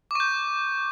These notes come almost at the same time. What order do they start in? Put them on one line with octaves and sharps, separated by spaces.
D6 C#6 G6